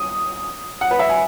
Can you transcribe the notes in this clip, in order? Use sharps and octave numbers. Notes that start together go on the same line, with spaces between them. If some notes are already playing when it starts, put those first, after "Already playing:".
Already playing: D#6
F#5
B4
E5
G#5